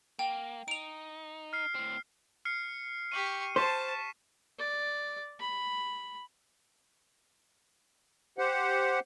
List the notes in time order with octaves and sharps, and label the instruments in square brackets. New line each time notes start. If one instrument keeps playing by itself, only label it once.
[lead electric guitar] A#3 [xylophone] G5
[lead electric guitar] D#4 [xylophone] D7 F7
[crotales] F6 C7
[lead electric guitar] A2 C4
[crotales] F6 C7 C#7
[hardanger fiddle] G4 C#6 [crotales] D#7
[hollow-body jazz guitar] C5 [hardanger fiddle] A5 [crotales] C#6 B6 E7
[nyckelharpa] D5
B5
[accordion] G4 C5 F#5